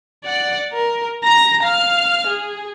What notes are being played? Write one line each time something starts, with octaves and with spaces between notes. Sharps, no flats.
D5 F#5
A#4
A#5 A#6
F5 F6
G#4